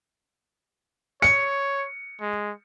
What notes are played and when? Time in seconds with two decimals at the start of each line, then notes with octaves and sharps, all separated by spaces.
1.22 C#5 C#7
2.21 G#3